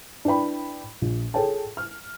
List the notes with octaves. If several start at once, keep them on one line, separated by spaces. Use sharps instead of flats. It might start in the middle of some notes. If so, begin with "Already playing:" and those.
D4 E4 B4 G5 B5
A#1
G#4 A4 C#5 G5 A5
F6